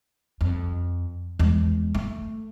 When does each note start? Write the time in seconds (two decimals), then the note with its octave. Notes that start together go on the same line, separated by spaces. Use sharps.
0.41 F2
1.39 E2 G#3
1.95 A3